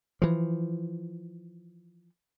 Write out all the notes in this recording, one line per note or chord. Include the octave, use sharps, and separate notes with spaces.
E3 F3